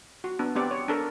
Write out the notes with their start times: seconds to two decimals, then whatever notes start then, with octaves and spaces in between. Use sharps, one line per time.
0.24 F#4
0.39 B3 D4
0.55 B3 C4 G4 D5
0.71 C#5
0.88 D4 A4 A#4